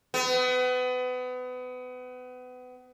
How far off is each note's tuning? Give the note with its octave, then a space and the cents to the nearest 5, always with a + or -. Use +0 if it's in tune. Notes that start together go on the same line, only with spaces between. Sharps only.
B3 +30